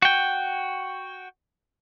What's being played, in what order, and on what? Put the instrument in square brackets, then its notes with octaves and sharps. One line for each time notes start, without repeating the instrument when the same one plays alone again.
[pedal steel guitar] F#4 G5